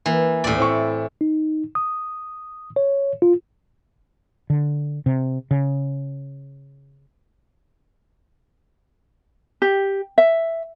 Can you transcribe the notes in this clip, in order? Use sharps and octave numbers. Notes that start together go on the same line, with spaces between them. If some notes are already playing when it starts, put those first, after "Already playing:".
E3 A#3
D#1 A#1 A2 D5
C4 E4 C#6
D#4
D#6
C#5
F4
D3
C3
C#3
G4
E5